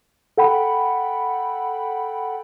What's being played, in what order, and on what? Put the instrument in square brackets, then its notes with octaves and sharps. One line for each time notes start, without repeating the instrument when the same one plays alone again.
[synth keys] A4 F#5 G5 B5